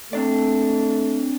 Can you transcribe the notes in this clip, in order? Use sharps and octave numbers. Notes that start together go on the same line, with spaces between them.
A3 C4 D4 D5